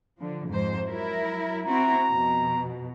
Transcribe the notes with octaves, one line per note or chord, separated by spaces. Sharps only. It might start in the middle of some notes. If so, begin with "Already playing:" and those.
D3 F3
F2 G#2 C5
F#3 E4 A#4
C4 E4 F#4 A#5
F2 B2